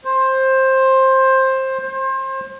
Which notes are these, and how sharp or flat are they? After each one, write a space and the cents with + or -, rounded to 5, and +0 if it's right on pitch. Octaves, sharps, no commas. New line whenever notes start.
C5 +15
C5 +30